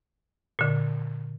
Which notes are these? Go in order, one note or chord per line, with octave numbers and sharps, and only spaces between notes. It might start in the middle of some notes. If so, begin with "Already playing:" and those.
A#2 D3